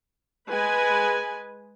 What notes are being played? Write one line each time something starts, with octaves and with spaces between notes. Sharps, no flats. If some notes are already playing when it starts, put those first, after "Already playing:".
G#3 B4 G#5